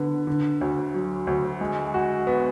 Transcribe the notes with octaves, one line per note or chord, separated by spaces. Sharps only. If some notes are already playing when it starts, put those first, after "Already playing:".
Already playing: D3 B3
D3
D2
F#3
D2
G#3
F#4
B3